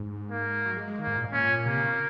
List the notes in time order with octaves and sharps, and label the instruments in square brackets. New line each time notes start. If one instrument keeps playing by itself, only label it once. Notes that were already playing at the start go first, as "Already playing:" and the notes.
Already playing: [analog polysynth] G#2
[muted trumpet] A#3
[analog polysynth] F#3
G#3
G#3
[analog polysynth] D#3 [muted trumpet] A#3
[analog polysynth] G#2
A#2
G#2
[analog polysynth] A#2 [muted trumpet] C#4
[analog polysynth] C3 [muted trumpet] A#3
[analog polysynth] C#3